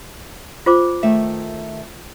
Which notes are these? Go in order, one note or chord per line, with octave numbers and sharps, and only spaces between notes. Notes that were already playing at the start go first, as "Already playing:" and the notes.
F4 C5 D6
D#3 A3 E5